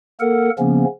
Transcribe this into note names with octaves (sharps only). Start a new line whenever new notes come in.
A#3 A4 A#4 F#5
C#3 F3 A#3 B3 C#4